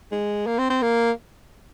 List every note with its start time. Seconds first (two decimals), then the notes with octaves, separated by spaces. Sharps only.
0.12 G#3
0.46 A#3
0.58 C4
0.70 C4
0.82 A#3